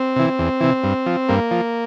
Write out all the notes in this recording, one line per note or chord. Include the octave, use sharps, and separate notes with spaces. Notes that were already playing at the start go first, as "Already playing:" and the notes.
Already playing: C4
C3 E3
E2
C3 E3
G2
F3
G2 A#3
F3